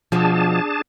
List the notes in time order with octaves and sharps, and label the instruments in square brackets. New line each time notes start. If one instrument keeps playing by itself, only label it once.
[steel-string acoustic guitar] B2 F3 [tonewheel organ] D4 G#4 A5